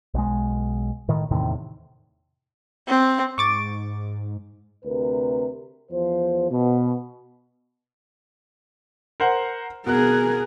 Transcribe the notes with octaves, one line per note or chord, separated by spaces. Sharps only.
B1 G#3
A2 D#3
E2 A2 C3 D#3
C4
G#2 C#6 D6 A6
D2 C3 A#4 B4
E2 F3 C5
B2
A#4 C5 F#5
B2 G#4 A#4 F#6